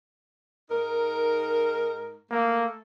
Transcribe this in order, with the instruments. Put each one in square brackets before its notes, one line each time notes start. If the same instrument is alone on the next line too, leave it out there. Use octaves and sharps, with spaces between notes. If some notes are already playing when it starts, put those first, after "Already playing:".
[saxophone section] G#2 D#4 A#4
[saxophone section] A3 A4 [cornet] A#3